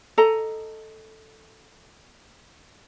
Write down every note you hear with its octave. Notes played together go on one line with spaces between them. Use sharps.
A4 D#5 A#5